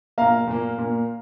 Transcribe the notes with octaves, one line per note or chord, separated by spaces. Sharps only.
A#2 A#3 F5 A#5
A#2 A#3
A#2 A#3